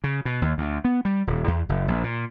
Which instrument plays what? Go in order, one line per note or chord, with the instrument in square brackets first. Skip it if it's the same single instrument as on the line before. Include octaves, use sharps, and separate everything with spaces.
[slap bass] C#3
B2
D#2
D2
B3
G3
D#1
E2
F#1
A#1
A#2